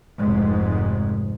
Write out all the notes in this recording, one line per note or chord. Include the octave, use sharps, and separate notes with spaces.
F1 G#2